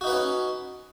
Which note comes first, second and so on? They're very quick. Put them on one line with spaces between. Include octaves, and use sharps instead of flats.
F#4 D#4 B4 F#5 C#4